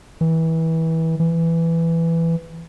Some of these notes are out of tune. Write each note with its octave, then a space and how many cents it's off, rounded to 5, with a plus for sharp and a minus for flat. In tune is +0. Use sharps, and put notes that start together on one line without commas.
E3 -25
E3 +10